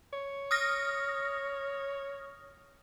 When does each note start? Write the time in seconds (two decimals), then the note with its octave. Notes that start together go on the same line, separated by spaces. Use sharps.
0.13 C#5
0.51 D#6 F6 A#6